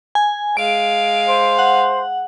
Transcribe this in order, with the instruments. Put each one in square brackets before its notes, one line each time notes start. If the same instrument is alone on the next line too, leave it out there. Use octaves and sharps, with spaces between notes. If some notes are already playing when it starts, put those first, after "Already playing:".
[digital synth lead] G#5
[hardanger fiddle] G#3 F5 [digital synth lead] D7
[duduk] C5
[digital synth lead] F#5